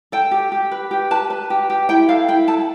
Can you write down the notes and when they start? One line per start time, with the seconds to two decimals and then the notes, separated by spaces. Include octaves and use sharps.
0.12 A4 G5
0.31 G4
0.52 G4
0.71 B4
0.91 G4
1.11 B4 A5
1.30 B4
1.50 G4
1.70 G4
1.89 E4 G5
2.09 A4 F5
2.28 E4 G5
2.48 A4 A5